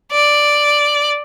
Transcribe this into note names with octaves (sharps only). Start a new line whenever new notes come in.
D5